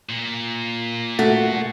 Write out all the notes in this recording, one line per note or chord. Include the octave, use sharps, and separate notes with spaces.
A#2
A3 F#4